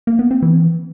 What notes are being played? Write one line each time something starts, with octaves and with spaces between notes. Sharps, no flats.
A#3
B3
C4
E3